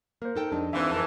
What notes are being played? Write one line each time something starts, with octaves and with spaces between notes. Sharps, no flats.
A#3 A#4 C5
D#4 A4 G5
F2 G#3 D4 D#4
G#2 D#3 E3 C4 E5 F5
F2 A#4 A5